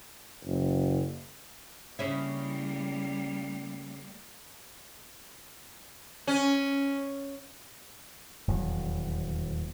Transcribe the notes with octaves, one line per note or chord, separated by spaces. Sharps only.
F#1
C#3 G3 A#3 C#4 E4
C#4
D#1 E2 F#3